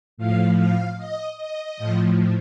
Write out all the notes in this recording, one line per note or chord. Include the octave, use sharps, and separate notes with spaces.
A2 F3 F5
F5
D#5
D#5
A2 F3